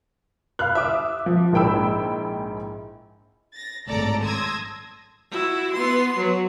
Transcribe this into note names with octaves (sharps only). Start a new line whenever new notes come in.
F5 B5 F6 F#6
E5 D6 D#6
F3
A#1 G#2 E4 G5 B5 E6
A6 A#6
G#1 A2 A4 D5 A#5 A6
A5 C6 D#6 E6 G#6 A#6
E4 F#4
B3 C6
F#3